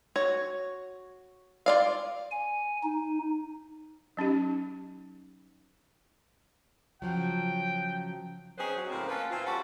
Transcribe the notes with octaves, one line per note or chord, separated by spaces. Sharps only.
F#4 C#5
F4 D5 F5
G#5
D#4
F#3 C#4 D#4 G4
C#3 F3 F#3 G5
C4 C#4 D#4 G#4 B4 C5
F#3
A2 C#3 G#3 A#3 C4
A#3 C#4 F4 A4 B4
A#2 E3 C4 F4
G3 C#4 F#4 A4 B4 F#5